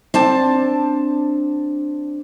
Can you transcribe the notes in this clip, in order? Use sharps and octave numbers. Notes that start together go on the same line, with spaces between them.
C4 D4 A5